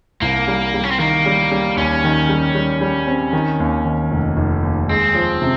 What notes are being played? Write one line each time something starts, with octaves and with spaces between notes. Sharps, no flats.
C2 A#3
G3
G3
C#4
C4
D#3 A#3
G3
G3
D#2 C#4
D#3
G3
G3
G3
C4
D#3
D#2
D#3
F1
F1
D#2
G#3 C4
F3
C3